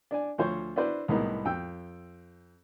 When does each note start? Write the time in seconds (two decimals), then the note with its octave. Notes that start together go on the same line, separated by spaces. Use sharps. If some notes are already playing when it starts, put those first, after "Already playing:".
0.11 D4 D5 G#5
0.38 D2 F3 C5 C#5 C#6
0.76 D4 E4 F#4 B4 C5 D5
1.08 C2 A2 G#3 B3 D#4 A#4
1.45 F2 G5 E6